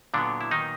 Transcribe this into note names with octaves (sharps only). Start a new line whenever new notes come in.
A#2 D3 F#3 B3 D4
E4
D#3 D#4